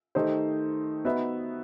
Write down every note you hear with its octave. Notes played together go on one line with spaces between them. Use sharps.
D#3 A3 D#4 G4 C5
B3 D#4 F#4 B4 E5